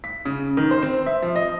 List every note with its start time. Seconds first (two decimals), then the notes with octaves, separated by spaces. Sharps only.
0.04 B6
0.25 C#3
0.57 D#3
0.71 C5
0.83 C4
1.06 E5
1.22 F3
1.36 D#5